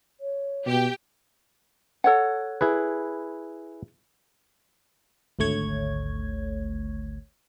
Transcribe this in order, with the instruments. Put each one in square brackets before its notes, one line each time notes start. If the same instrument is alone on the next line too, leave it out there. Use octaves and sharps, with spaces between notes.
[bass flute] C#5
[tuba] B2 [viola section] G4 G5
[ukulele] A4 C#5 F#5
[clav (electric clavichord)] E4 G#4 B4
[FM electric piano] G#1 D2 A3 C#5 G#6